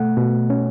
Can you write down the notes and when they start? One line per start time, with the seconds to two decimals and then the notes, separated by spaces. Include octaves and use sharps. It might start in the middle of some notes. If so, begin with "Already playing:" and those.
Already playing: B2 A3 F#5
0.17 B2
0.50 C#4